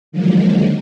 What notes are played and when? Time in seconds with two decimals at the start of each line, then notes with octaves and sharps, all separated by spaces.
0.12 D3 D#3 F3 F#3 G#3 A#3